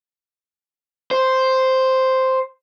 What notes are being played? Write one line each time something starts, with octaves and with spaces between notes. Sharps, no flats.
C5